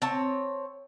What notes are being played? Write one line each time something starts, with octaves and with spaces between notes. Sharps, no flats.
C4 C#5 A5